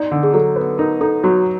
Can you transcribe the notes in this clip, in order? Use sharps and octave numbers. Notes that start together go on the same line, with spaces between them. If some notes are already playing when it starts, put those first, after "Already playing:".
Already playing: D#4 D5
D3
G#4
F#3 A4
B3
D#4 A#4
D#4 A4
F#3 F#4